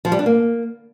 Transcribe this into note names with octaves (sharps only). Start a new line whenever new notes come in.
F3
G3
D4
A#3